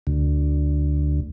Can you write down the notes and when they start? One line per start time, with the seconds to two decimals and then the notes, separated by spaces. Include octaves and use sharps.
0.07 D2